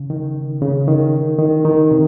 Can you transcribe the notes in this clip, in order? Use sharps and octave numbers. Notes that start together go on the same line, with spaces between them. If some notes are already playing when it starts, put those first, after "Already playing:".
Already playing: C#3
D#3
C#3
D#3
D#3
D#3
C3